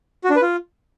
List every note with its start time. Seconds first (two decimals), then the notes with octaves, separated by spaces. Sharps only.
0.24 F#4
0.30 D4
0.36 B4
0.42 F4